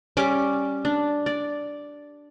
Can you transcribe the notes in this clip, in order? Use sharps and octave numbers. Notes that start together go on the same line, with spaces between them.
G3 C#4 D6
D4
D5